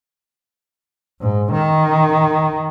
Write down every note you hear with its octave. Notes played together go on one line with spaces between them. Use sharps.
G#2
D#3